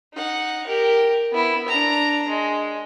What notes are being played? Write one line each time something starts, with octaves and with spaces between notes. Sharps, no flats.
D#4 F#5
G4 A#4
B3 E4
D4 A#5
G#3